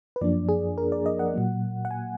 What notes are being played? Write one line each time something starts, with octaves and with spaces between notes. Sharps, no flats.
B4
F#2 F3 A#3 D4 D5
G#4
A#4
D5
D#5
F#5
A#2 F#3 A#3
F#5
G#5